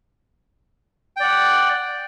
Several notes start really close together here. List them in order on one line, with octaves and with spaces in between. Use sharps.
G5 D5 F#5